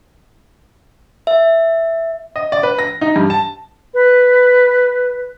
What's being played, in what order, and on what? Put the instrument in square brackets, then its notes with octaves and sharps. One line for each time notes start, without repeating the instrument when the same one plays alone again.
[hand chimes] E5
[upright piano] D#5
D5
B4
A#6
D#4
G2
A5
[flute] B4